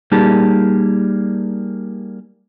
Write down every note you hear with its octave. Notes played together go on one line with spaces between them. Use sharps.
G3 A#3 D#4 G4 G#4 A5